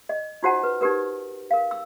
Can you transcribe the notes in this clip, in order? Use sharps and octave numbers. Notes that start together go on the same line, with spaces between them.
D#5
D#4 F4 F#4 C5 F#5 A5
B4
D#4 F#4 G4 A#4 B4
A#4 F5
E6